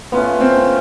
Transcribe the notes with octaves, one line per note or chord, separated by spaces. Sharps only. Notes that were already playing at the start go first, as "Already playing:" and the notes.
A3 B3 C#4 F4
C4